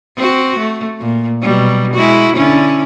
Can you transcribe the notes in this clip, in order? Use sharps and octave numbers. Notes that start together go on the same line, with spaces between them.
C4 F#4
A3
A#2
B2 F#3 G3
G#3 E4 F#4
D3 C#4 E4